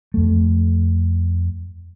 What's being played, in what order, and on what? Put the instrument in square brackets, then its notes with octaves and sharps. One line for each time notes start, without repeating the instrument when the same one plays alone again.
[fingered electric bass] F2 A3